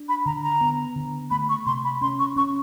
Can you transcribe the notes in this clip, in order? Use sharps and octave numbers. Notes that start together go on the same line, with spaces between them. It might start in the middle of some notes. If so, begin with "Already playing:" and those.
Already playing: D4
B5
D3 A#5
A#5
B3
D3
A3 B5
C#6
C3 C6
B5
C#4 C6
C#6
C#4 C#6